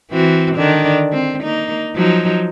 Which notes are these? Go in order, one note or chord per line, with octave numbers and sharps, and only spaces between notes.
E3 C4 F#4
D3 D#3 D4
C4
A#3 D#4
F3 F#3 D#4